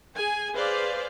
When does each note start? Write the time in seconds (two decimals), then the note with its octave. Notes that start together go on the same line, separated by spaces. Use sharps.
0.15 G#4 G#5
0.55 G#4 B4 C5 D5 F5